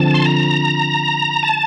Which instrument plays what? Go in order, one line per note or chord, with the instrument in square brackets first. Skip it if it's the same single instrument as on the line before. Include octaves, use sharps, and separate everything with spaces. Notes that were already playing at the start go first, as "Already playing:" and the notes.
Already playing: [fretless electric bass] D3 F3 C4 [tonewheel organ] A5
[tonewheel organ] C6
A#5
A5